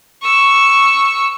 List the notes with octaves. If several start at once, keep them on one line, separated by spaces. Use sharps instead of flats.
C#6 E6